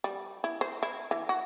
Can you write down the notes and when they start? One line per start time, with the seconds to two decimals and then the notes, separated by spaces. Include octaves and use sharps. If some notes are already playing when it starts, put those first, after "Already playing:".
0.04 G3
0.44 E4
0.61 C5
0.83 E4
1.11 E3
1.29 F#4